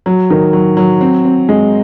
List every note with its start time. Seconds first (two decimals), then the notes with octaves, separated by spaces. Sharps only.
0.06 F#3
0.30 D#3
0.53 F#3
0.77 F#3
1.01 C4
1.25 C4
1.49 G#3